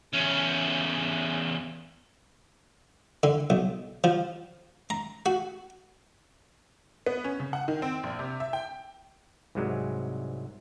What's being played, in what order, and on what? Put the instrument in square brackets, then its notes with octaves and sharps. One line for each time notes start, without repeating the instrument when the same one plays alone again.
[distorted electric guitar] E2 C#4
[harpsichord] D3
B1
F3
A#5
F#4
[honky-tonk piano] B3
C#4
C#3
F#5
D#3
C4
A#1
C3
E5
G5
[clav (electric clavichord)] C2 G#2 C3 F#3 G#3